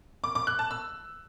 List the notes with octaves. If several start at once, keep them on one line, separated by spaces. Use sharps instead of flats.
D6
D6
F#6
A5
E6